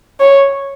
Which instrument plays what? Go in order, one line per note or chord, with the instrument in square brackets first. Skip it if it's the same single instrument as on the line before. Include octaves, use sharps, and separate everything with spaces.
[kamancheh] C#5